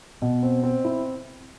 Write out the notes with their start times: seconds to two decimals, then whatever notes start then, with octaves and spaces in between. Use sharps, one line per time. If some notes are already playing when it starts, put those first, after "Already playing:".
0.22 B2
0.43 C4
0.63 C4
0.85 E4